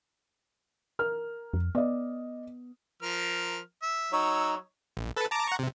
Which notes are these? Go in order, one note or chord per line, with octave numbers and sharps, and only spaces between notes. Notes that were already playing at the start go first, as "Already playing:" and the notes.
A#4 F6
F2
B3 D5 D#5
F3 A#4 F6
E5
F#3 D#4 C#5 E6
A#1
A4 B4 A5
A5 A#5 D6
F#5 A#5 C#6
C3